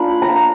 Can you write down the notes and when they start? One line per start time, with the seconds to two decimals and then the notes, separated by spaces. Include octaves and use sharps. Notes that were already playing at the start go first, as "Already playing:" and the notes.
Already playing: A#3 D4 F4 B5
0.22 A#5